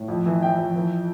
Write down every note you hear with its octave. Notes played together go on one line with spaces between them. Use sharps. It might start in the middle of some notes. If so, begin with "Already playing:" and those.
Already playing: A2
F2
E3
E3 G5
F2
E3